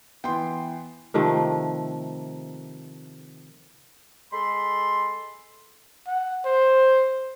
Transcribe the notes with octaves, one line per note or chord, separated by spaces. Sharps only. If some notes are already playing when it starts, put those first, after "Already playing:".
E3 B3 G5 C6
C3 D#3 F3 A3
G#3 A4 B5 C6
F#5
C5